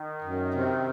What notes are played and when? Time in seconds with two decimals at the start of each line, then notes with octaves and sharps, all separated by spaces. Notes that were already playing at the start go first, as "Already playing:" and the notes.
Already playing: D#3
0.21 F#2
0.53 C3